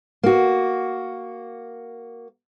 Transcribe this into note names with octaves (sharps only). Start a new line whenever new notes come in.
A#3 F#4